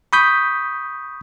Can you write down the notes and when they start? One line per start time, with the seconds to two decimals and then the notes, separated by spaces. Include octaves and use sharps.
0.13 B5 C#6 D#6 G6 B6